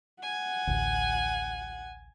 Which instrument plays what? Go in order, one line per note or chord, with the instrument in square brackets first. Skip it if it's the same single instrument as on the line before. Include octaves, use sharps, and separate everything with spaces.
[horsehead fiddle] F#5 [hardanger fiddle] G#5
[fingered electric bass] A1 D2